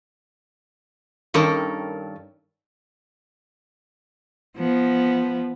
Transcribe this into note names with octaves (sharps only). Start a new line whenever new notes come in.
G2 D#3 C#4 A4 A#4
F3 B3